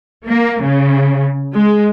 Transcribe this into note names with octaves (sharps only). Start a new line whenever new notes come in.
A#3
C#3
G#3